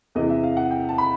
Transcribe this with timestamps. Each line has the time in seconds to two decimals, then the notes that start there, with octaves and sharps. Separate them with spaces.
0.15 E2 C3 E3 D#5
0.30 E5
0.44 F5
0.57 F#5
0.71 G5
0.89 A5
0.98 B5